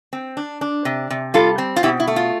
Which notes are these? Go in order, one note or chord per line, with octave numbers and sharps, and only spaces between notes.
C4
D4
D4
C3
C3
G3 F4 A4
C4
F4
B2 E4 G4
E4
A3
F4